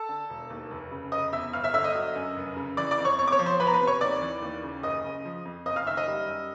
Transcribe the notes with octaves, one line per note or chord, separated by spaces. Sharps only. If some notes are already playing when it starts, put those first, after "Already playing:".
Already playing: A4 A5
D3
E1
D#2
F1
C#3
F1 D#5 D#6
E2 E5 E6
G1 F5 F6
E5 E6
D3 E5 E6
D#5 D#6
F#3
F#2
F1
C#3
E3 D5 D6
D5 D6
F2
C#5 C#6
E2 C#5 C#6
D6
C#5 C#6
F3
C5 C6
E2 B4 B5
A#5
B4 B5
C3
C#5 C#6
D#2 D5 D6
E3
D#2
C#3
F#1 D#5 D#6
C#3
F3
F2
F#1 D#5 D#6
F5 F6
D#3 E5 E6
D#5 D#6
G3
F#2